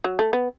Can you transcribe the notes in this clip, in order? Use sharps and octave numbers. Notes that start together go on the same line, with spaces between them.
F#3
A3
B3